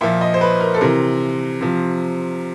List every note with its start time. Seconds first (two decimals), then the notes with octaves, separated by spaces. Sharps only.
0.01 A#2 F3 E5
0.21 D#5
0.34 C5
0.41 B4
0.60 A#4
0.74 A4
0.81 C3 E3 A#4
1.61 C3 F3